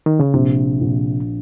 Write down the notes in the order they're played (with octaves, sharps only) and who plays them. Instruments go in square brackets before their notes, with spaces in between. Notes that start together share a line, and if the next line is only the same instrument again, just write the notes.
[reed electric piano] D#3
C#3
[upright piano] A#1 [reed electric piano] C3
[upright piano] A#1